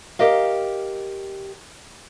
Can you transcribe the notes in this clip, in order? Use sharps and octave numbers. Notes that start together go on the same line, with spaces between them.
G4 A#4 D#5 F5